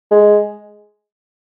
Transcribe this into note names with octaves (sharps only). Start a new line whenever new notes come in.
G#3